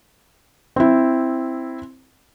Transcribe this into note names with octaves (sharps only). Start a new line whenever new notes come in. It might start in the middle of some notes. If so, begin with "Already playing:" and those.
C4 E4